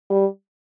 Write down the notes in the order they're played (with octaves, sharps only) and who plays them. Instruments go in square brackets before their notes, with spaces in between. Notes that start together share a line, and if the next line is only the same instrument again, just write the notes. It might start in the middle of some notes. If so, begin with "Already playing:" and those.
[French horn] G3